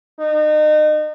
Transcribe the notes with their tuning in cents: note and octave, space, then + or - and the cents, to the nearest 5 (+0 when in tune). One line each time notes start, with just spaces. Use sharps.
D#4 -35